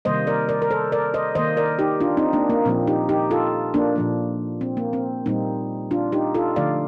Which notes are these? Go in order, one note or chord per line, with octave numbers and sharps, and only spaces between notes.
C3 D#3 G3 A#3 C5 D#5
A#4 D5
A#4 D5
A#4
A4 C5
A#4 D5
C5 D#5
D#3 A#3 C5 D#5
A#4 D5
D#4 G4
D4 F4
C4 D#4
A#3 D4
A#3
A#2 F3 A#3 C4
D#4 G4
D#4 G4
F4 A4
A#3 D4
A#2 F3 A#3
C4
A#3
C4
A#2 G3 A#3 C4 D#4
D4 F4
D#4 G4
F4 A4
D3 F3 A3 D5 F5